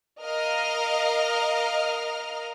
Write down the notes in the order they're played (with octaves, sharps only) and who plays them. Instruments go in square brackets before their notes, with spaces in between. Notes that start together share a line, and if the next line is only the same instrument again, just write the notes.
[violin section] A#4 D#5 F5 F6